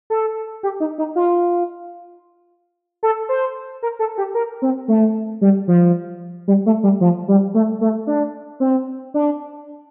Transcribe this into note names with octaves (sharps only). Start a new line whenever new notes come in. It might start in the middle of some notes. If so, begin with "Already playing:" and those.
A4
G4
D#4
D#4
F4
A4
C5
A#4
A4
G4
A#4
C4
A3
G3
F3
G3
A3
G3
F3
G3
A3
A3
D4
C4
D4